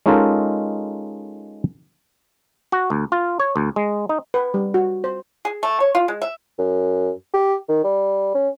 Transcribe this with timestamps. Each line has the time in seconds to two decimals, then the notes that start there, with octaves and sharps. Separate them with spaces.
0.06 G#3 C#4 D#4 F4 A4 A#4
2.72 F#4
2.90 D2
3.12 F4
3.40 C#5
3.56 D2
3.76 G#3
4.09 D#4
4.34 B4
4.54 G3
4.74 F#4
5.04 C5
5.45 G#4
5.63 A3
5.80 C#5
5.95 F4
6.08 G#3
6.22 E5
6.58 F#2
7.34 G4
7.69 D#3
7.84 G3
8.34 C#4